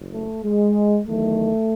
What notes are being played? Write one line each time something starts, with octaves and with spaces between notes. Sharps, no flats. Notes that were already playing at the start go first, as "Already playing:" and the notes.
Already playing: F#1
A3
G#3
E2 D#3 F#3 A3